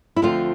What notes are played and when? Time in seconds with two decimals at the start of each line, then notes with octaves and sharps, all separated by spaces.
0.16 E4
0.22 D2 D3 F3 A3 C4 F4